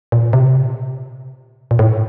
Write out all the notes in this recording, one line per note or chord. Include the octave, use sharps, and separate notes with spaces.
A#2
C3
A#2
A2